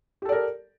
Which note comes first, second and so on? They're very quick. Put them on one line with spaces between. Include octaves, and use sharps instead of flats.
G4 A4 D5 A#4